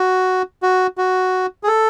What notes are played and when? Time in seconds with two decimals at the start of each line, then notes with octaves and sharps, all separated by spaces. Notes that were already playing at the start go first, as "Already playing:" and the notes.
Already playing: F#4
0.63 F#4
0.98 F#4
1.63 G#4
1.68 A4